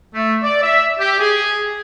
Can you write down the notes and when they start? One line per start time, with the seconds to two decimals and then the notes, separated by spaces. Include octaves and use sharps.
0.14 A3
0.43 D5
0.63 E5
0.99 G4
1.20 G#4